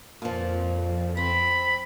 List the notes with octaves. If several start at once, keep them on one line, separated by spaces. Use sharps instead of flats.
F2 A#2 F3
C4 B5